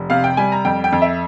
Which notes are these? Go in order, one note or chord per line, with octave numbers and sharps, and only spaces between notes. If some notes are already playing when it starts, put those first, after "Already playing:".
Already playing: F1
C3 F5
G5
G3 G#5
A#5
F2 G5
G5
F2
E5